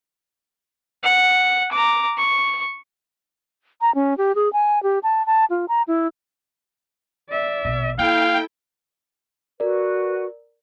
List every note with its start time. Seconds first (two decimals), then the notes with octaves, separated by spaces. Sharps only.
1.03 F#5
1.72 A#5 D6
2.17 C#6
3.81 A#5
3.95 C#4
4.18 G4
4.35 G#4
4.53 G#5
4.83 G4
5.03 A5
5.26 A5
5.50 F4
5.68 A#5
5.88 E4
7.30 D5 E5
7.65 A#1 B2
7.99 A#3 E4 A4 F5 G5
9.60 F#4 A#4 B4 D5